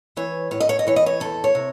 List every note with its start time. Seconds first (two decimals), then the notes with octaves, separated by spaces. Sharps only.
0.17 E3 C#5
0.51 A2 C#5
0.60 D#5
0.69 C#5
0.79 D#5
0.87 E3 C#5
0.96 D#5
1.06 C#5
1.20 E2 A4
1.44 C#5
1.55 C3